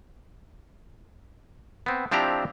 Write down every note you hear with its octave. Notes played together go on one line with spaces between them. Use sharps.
B3 C4
F3 C4 D4 E4 G4 A#5